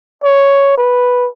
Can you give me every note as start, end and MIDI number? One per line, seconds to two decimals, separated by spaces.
0.23 0.74 73
0.78 1.28 71